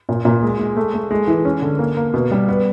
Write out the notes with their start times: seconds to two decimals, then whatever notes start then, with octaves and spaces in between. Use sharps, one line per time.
0.09 A#2
0.25 A#2
0.43 G#3
0.59 G#3
0.77 A3
0.94 A3
1.11 G#3
1.27 E3
1.45 C#4
1.62 D3
1.79 A#3
1.97 A#3
2.14 B2
2.31 G3
2.49 B3